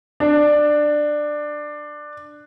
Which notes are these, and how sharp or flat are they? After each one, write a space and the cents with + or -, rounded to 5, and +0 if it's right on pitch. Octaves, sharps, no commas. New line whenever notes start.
D4 +15